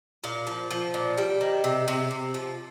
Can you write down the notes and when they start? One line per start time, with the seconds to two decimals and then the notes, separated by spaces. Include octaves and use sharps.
0.24 A#2 F5
0.47 F3
0.71 F3
0.94 A#2
1.17 G3 G5
1.41 D#3
1.64 C3
1.88 C3
2.11 C3
2.34 F3